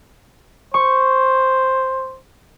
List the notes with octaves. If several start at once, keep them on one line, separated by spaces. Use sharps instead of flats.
C5 C#6